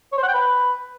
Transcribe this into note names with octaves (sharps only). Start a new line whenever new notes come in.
C#5
C5
F#5
G5
B4